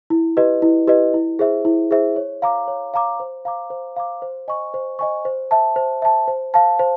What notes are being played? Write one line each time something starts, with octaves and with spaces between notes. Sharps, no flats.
E4
G4 B4 D#5
E4
G4 B4 D#5
E4
G#4 C5 E5
E4
G#4 C5 E5
C#5
F5 A#5 D6
C#5
F5 A#5 D6
C5
F5 A#5 D6
C5
F5 A#5 D6
C5
D#5 G#5 C#6
C5
D#5 G#5 C#6
C5
E5 A5
C5
E5 A5
C5
F5 A5
C5